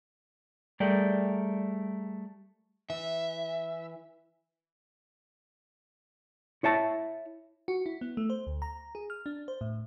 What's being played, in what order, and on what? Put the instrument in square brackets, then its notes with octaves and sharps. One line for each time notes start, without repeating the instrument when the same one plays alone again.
[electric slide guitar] G3 A3 G#4 A#4 D5 G5
[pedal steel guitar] E3 [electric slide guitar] E5
[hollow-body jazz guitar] E4 C#5 E5 A5
[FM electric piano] F#4
E4
B3
A3
C5
D2
A#5
G#4
F6
D4
C5
A2